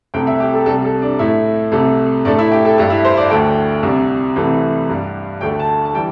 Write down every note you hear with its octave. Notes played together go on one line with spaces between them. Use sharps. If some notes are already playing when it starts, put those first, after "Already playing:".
C2 C3 A3 G5
E5
G4
A4
C2 C3 G3 A4
A4
D4
A2 A3 E4
C2 C3 A3
A2 A3 D4
E4
G4
A4
G2 G3 A4
E4
C5
D5
D2 D3 A3 G5
C2 C3 G3
C2 C3 E3 A3
G2 G3
D2 D3 A3 G5
A5
A5
E3 G3 G5